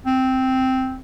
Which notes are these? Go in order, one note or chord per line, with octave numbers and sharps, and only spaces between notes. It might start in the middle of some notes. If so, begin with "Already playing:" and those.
C4